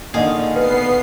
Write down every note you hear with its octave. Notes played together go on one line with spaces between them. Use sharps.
A#2 D3 D#3 G#4 D#5 F5
B3 B4 C7